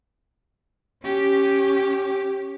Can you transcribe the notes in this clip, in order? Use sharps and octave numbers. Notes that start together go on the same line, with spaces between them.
C#4 G4